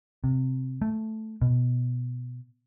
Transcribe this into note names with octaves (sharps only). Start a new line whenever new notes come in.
C3
A3
B2